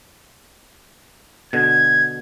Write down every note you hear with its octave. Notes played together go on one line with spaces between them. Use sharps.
B2 D3 G#6